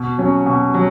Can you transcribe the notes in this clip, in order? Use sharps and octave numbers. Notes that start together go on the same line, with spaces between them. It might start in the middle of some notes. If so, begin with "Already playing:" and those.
Already playing: B2
F#3 C#4
B2
F#3